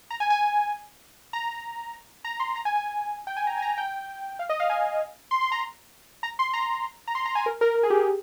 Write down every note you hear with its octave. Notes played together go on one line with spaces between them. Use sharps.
A#5
G#5
G#5
A#5
A#5
C6
A#5
G#5
G#5
G5
G#5
A#5
G#5
A#5
G5
F5
D#5
F5
G#5
C6
C6
A#5
A#5
C6
A#5
A#5
C6
A#5
G#5
A#4
A#4
A#4
G#4
G4
G#4